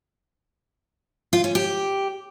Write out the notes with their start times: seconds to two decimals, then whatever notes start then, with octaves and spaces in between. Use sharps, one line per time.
1.33 F4
1.44 C#4
1.55 G4